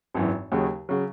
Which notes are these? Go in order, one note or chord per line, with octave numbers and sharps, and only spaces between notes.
G#1 F#2 E3
D#2 C#3 F#3
C#3 F#3